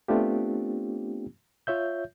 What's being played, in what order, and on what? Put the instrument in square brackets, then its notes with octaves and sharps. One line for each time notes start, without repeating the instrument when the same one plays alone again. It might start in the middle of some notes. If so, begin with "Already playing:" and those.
[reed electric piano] A3 B3 C4 D4 F4 G4
F4 C#5 E5 G6